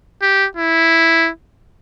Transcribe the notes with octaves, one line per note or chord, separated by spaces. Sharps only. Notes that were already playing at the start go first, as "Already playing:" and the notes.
G4
E4